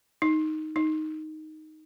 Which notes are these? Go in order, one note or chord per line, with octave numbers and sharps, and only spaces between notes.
D#4
D#4